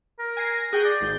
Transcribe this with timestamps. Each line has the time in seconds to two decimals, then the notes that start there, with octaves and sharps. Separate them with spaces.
0.19 A#4
0.37 G#5 A#6 C7
0.73 F#4 G#4 G5
0.85 D5
1.01 G#1 G6